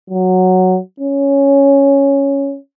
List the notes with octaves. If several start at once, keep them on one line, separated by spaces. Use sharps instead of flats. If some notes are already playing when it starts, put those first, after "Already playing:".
F#3
C#4